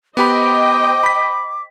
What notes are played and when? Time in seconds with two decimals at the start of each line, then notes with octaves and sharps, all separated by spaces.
0.17 B3 G4 C5 D#5 G5 B5 D6
1.03 B5 B6